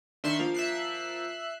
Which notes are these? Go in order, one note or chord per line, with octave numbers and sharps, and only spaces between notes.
D#3 D4 E5 C6 C#6
F3 A#3 F5
E5 F#6 C7